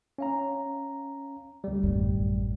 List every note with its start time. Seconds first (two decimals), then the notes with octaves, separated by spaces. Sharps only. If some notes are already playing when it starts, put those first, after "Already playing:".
0.18 C#4 F5 A#5
1.64 D2 G3
1.83 A1 F#2